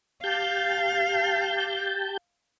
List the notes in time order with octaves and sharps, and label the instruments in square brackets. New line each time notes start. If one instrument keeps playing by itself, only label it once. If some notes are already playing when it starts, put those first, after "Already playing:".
[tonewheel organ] G4 A5 G6 [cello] F5